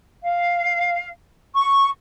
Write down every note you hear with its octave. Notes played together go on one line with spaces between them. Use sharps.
F5
C#6